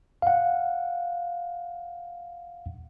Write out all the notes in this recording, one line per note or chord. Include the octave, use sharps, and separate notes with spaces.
F5 F#5